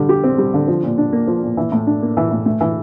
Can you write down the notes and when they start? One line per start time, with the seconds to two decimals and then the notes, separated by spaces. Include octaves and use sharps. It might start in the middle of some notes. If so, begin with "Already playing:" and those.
Already playing: D3 G3
0.09 G4
0.24 C4
0.38 G3
0.54 D3
0.68 F3
0.83 A#2
0.98 D4
1.13 A#3
1.28 F3
1.43 A#2
1.57 E3
1.72 A2
1.87 D4
2.02 A#3
2.17 E3
2.31 A2
2.46 A3
2.61 E3